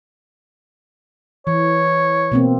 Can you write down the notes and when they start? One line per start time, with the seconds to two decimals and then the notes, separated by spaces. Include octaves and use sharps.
1.47 E3 C#5
2.32 B2 A#3 C4